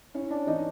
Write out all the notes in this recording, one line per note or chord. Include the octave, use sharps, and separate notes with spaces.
C#4 E4 C#5
D4 D5
E3 D#4 D#5